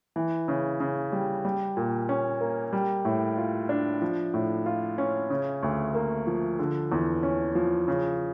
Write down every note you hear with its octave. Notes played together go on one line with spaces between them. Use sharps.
E3
C#3
C#3
G3
G3
A#2
C#4
A#3
G3
A2
F4
D4
F3
A2
F4
C#4
C#3
D2
A#3
F3
D3
E2
C#4
F3
C#3